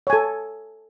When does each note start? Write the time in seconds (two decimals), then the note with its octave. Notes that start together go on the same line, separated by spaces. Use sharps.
0.07 C#5
0.10 G#5
0.13 A4